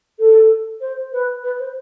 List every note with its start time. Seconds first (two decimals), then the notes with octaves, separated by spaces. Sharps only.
0.19 A4
0.80 C5
1.12 B4
1.43 B4
1.59 C5